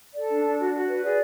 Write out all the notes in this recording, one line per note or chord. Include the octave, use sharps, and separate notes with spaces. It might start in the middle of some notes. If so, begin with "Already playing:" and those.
A4 D5
D4
D4
F#4
F#4
B4
G#4 D5